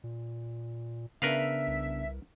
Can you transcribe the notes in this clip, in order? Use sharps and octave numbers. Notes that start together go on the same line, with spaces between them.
A#2
C#3 B3 D4 A#4 B4 E5 F5
C2